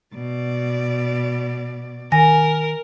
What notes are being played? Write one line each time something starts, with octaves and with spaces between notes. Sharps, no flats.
B2 D5
D#3 A#4 G#5 A#6